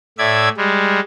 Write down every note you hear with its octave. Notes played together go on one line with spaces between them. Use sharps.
A2 D5 E5 G#6
G3 G#3